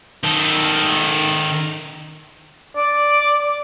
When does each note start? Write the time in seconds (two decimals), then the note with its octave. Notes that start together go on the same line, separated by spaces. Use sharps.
0.24 D#3 A4
2.77 D5